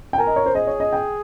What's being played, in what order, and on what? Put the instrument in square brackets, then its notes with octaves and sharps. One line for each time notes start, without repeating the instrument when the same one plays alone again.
[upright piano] G5
[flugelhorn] A#4 [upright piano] G#5
[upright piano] D#5
C#5
C5
[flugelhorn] G#4 [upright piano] D#5
[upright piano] C#5
D#5
G5